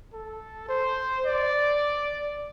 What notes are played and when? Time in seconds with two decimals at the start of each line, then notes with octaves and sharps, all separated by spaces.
0.13 A4
0.68 C5
1.26 D5